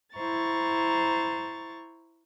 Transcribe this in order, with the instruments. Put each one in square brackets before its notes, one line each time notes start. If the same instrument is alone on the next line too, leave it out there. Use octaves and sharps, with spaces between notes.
[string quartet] E4 C5 A#5 C#6 A6